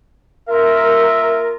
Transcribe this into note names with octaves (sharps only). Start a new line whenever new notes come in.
A#3 F4 A#4 E5